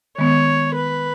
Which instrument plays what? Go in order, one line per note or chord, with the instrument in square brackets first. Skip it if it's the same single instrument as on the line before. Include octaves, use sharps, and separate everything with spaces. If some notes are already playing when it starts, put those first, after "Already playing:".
[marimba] D#3 G#3 B3 [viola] C#5
[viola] B4